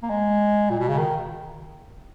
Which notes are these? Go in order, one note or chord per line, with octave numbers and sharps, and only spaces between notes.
A#3
G#3
A#2
B2
C#3
D#3